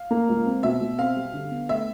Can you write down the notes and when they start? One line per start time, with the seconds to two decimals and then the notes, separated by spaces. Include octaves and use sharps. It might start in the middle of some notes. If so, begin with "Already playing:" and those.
Already playing: F5
0.11 A#3
0.29 C#2
0.46 C4
0.63 B2 E5
0.81 B2
0.98 C4 F5
1.16 G3
1.34 D3
1.51 B3
1.69 A3 E5